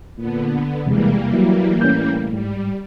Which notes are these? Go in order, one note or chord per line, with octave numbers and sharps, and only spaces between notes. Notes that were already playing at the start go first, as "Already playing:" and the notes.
A#2 D3 B3
E2 C3 E3 G3 G#3 A#3
F#3 E4
A2 C#4 G6
G#2 G3